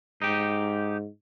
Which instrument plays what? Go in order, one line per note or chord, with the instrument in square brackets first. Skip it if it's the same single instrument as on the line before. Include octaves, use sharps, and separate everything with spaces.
[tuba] G#2 [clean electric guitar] D#4 G4